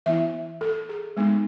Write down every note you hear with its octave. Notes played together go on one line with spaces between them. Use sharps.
E3 B3 E4 E5
A4
G#4
G#3 B3 D#4